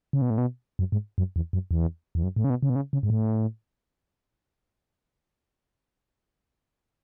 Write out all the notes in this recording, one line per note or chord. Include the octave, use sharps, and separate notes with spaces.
C#3
B2
A2
B2
F#2
G#2
F#2
E2
F#2
E2
E2
F#2
A2
C#3
B2
C#3
B2
C#3
C#3
G#2
A2